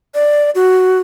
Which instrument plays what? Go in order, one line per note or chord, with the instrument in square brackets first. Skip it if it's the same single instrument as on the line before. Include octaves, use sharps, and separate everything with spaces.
[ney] D5
F#4